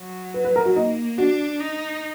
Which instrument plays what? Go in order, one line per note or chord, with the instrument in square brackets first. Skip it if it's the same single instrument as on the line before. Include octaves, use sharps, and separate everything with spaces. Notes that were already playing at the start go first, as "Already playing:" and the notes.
Already playing: [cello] F#3
[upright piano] B4
B4
A#4
F#4
[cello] A#3 [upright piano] D#4
[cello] D4 [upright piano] F#4
[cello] D#4